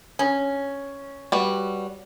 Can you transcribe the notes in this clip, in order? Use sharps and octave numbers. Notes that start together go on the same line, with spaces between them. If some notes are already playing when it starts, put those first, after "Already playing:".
C#4
G3 F#4 B4